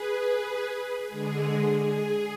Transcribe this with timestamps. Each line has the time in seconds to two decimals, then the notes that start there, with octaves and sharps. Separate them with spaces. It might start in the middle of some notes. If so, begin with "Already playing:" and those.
Already playing: G#4 B4
1.08 D3 G#3 G#4
1.79 G#4